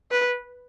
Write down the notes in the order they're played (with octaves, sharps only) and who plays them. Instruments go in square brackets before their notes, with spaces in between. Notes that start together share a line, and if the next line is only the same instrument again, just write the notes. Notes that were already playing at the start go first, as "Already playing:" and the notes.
[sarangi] B4